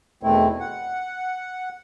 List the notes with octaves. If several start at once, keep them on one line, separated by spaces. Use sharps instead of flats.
E2 B2 D#3 A3 C4 E4
F#5